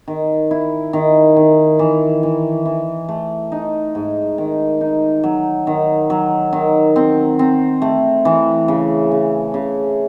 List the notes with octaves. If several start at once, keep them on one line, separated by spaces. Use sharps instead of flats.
D#3
E4
D#3
D#3
E3
E3
E3
A3
D#4
G#2
D#3
D#4
F#3
D#3
F#3
D#3
C4
C4
A3
E3
C#3
C#3
C#3